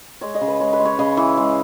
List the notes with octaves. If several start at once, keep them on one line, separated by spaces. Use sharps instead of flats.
G#3 C#5
D#5
C#3
B4
G#3 C#5
B4
G#3
C#5
C#3 D#5
E3
G#3